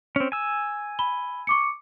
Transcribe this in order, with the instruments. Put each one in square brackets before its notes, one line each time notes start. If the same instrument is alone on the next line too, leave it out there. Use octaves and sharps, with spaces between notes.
[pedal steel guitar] C4 C#4
G#5 E6
[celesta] B5 G7
C#6 D6 C#7